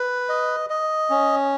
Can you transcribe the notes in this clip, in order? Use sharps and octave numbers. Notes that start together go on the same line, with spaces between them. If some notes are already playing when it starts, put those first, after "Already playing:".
Already playing: B4
D#5
D#5
C#4